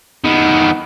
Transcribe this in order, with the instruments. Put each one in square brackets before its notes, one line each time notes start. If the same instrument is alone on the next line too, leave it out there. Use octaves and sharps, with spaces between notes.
[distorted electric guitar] D#3 B3